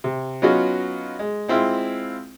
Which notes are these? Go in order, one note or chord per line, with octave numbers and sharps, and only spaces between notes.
C3
F#3 B3 C#4 D#4 F4 F#4
G#3
G#3 C4 E4 F4